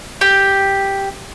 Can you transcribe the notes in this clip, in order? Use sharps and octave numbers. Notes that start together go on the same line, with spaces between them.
G4